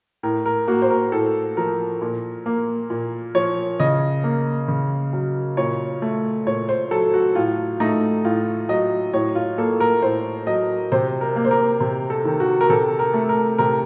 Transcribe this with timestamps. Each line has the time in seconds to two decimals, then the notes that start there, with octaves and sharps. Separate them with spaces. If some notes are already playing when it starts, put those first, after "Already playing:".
0.23 A2 A#4
0.46 A#4
0.68 A#3 F#4
0.82 C5
0.90 A#4
1.12 A2 A4
1.57 F3 A#4
2.02 A#2
2.46 A#3
2.90 A#2
3.35 F3 C#5
3.80 C#3 D#5
4.24 A#3
4.68 C#3
5.13 F#3
5.57 A#2 C#5
6.02 A3
6.47 A#2 C#5
6.69 C5
6.91 F#3 A4
7.14 F#4
7.35 A2 F4
7.80 A3 D#4
8.24 A2 F4
8.69 F#3 D#5
9.13 A2 C#5
9.35 F4
9.58 A#3 A4
9.80 A#4
10.02 A2 C5
10.47 F#3 D#5
10.92 C3 C5
11.21 A#4
11.36 A#3
11.45 C5
11.51 A#4
11.80 C3
12.10 A4
12.25 D#3
12.40 F#4
12.61 A#4
12.69 C3 A4
12.99 A#4
13.14 A3
13.29 A#4
13.58 C3 A#4